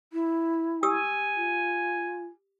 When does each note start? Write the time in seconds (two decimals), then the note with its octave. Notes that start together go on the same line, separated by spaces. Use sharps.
0.13 E4
0.83 G4 G#5 D#6 E6
1.36 F4